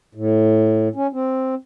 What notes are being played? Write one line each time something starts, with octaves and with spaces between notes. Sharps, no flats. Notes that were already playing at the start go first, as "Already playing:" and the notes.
A2
C#4
C4